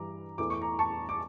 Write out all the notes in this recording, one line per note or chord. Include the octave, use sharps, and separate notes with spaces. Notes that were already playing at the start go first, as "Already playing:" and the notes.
Already playing: G2 E3 G3 A#5 D6
E2 E3 A3 D6
C#6
A#5 D6
A5 C#6
D6